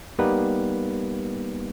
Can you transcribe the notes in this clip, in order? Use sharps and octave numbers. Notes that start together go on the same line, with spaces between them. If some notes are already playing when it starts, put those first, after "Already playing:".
G3 A#3 B3 D#4 G4 B4